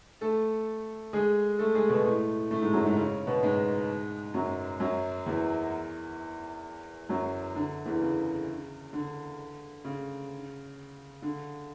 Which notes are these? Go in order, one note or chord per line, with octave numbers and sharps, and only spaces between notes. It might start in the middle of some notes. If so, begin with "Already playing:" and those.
A3 A4
G#3 G#4
A3 A4
G#3 G#4
B2 B3
A2 A3
A2 A3
G#2 G#3
F#2 F#3
G#2 G#3
C#3 C#4
B2 B3
G#2 G#3
F#2 F#3
F#2 F#3
E2 E3
F#2 F#3
D3
E2 E3
C#3
D3
C#3
D3